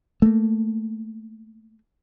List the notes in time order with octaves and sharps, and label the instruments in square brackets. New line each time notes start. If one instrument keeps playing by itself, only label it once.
[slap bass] A3 A#3